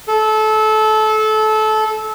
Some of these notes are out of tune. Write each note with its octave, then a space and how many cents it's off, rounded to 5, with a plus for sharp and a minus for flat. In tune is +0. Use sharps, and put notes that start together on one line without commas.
A4 -25